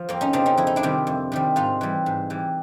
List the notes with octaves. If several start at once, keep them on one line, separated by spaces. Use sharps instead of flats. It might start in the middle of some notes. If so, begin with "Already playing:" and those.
Already playing: F3
F2 A#3 C4
C#4 D#4
C#3 F3 C4 D4
C#4 D#4
F2 E4
D#4
D4 E4
C3 D#3 G3
F2
C3 D#3 G3
G#2 D#4 F4
E3 G3
G#2
E3 G3